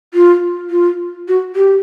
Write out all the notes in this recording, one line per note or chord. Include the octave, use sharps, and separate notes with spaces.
F4
F4
F#4
G4